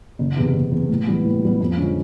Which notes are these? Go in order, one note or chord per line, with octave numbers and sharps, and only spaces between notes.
F#1
E2 C3
F#1
E2 C3
A2
E3 G3 B3
A2
E3 G3 B3
F2
D3 F3 G#3 C#4